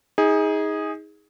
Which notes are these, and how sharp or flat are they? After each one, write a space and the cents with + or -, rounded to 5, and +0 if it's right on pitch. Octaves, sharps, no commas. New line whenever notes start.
D#4 +30 G#4 -10